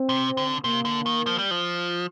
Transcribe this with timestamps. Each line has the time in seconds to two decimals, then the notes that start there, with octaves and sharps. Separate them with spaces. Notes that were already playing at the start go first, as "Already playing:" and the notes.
Already playing: C4
0.09 C3
0.37 D3
0.64 C3 A#3
0.85 D3
1.06 D#3
1.26 F3
1.38 G3
1.51 F3